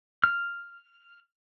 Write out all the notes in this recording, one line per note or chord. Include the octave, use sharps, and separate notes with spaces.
F6